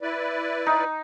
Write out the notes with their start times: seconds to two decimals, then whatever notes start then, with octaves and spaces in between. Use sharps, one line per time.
0.01 E4 B4 D5
0.66 D#4